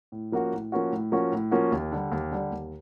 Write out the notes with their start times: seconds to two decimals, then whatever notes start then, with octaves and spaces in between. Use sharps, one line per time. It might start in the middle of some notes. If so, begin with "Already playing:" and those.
0.12 A2
0.32 F3 A#3 C#4 F#4
0.52 A2
0.72 F3 A#3 C#4 F#4
0.92 A2
1.12 F3 A#3 C#4 F#4
1.32 A2
1.51 F3 A#3 C#4 F#4
1.72 D#2
1.92 D3 G3
2.12 D#2
2.31 D3 G3
2.51 D#2